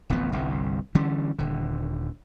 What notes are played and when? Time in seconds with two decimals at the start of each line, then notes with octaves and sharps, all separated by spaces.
0.10 D1 A1 F2 B3
0.32 G1 C2 G2
0.95 D3 E3 G3 C#4
1.39 D#1 D3